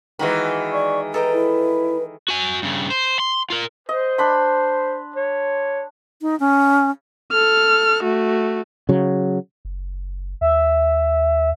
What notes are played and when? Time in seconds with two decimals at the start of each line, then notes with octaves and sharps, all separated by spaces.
0.19 D#3 E3 G#3 F#4 B5
0.72 D5 C#6
1.14 A4 B4 D#5 G5 A#5
1.32 E4
2.28 F#4 G#5
2.62 G2 C#3
2.90 C5
3.20 C6
3.50 F4 A#4
3.89 C5 D#5
4.18 D4 B5 C6
5.16 C#5
6.22 D#4
6.40 C#4
7.32 A4 F6
8.03 A3 F#4
8.89 C#3 F#3
9.65 F#1
10.41 D#2 E5